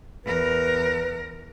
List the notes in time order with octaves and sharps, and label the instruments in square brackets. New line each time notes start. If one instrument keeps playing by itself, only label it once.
[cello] E2 A#4 [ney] B4